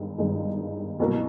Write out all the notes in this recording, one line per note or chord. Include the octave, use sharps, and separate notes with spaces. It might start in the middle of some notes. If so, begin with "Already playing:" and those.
Already playing: G1 G2 D#3 G#3
G1 G2 D#3 G#3
C2 B2 F#3 A#3